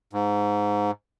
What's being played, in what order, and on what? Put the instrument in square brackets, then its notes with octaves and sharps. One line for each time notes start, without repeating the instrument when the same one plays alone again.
[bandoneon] G#2